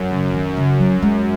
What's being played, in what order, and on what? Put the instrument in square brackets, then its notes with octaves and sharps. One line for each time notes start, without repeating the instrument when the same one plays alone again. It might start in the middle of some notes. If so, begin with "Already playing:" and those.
Already playing: [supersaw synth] F#2
[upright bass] C#3
D#3
C#3
F#3
G#3